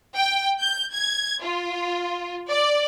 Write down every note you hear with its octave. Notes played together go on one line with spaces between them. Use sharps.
G5
G6
G#6
F4
D5